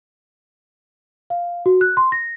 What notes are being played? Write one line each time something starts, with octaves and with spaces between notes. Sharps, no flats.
F5
F#4
F#6
C6
A#6